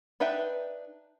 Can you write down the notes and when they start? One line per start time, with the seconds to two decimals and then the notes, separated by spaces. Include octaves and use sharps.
0.20 D4 D#4 B4 E5 G5